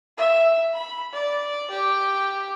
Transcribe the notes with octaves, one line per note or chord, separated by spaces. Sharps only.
E5
B5
D5
G4